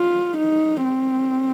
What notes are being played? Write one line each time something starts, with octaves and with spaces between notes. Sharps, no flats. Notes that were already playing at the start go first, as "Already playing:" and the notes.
Already playing: F4
D#4
C4